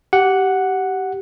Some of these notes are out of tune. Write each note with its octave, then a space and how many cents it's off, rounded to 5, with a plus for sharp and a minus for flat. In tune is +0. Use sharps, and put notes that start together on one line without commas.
G4 -20 F#5 +0